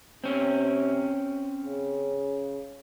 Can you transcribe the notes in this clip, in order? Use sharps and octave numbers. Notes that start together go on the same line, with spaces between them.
C3 C4 C#4
C#3